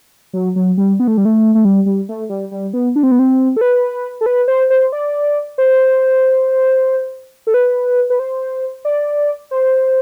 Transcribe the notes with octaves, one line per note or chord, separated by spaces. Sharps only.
F#3
F#3
G3
B3
A3
G3
A3
A3
G3
G3
A3
G3
G3
B3
D4
C4
B3
C4
A4
B4
A4
B4
C5
C5
D5
C5
A4
B4
B4
C5
D5
C5